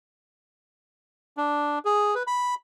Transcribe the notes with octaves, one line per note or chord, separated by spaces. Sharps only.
D4
G#4
B4
B5